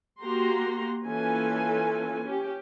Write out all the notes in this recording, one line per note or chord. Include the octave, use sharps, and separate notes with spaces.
A#3 F#4 G4 A#5 C6
E3 A#3 C#4 F4 A4 G#5
C#4 G4